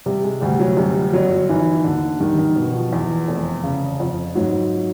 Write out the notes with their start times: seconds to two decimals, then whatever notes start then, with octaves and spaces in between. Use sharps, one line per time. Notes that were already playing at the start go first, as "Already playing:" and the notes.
0.06 C3 G3
0.24 G#3
0.41 D2 G3
0.59 F#3
0.77 F#2 G3
1.13 G1 F#3
1.49 D#3 E3
1.84 D#2 D3
2.20 D#3 G3
2.38 D#3
2.56 B2
2.74 F3
2.93 E2
3.28 F1
3.63 C#3
4.00 F2
4.35 G#2 F#3